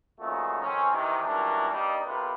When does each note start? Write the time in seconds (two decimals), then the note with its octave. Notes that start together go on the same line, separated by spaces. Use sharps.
0.19 A#2 C#3 F3 A3 D#4 F#4
0.61 F2 D#3 C4 C#4
0.91 C3 D#3 E3
1.22 C#2 E3 G3 D4 F#4 A#4
1.70 G2 G3 A#3 D4 D#4
2.04 B1 C3 F4 A#4 B4